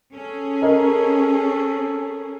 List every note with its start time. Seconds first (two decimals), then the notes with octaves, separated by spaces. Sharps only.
0.14 C#4 G#4 A4
0.62 A#4 D#5